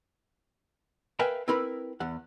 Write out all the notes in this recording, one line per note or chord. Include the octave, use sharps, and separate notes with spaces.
A#4 B4 E5 F5 G5 G#5
C4 E4 A#4 B4 B5
E2 F#5